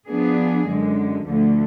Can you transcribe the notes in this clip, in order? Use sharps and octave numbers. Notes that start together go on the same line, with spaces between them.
F3 B3 D4 G#4
F#2 D3 G#3
D2 D3 F3 A3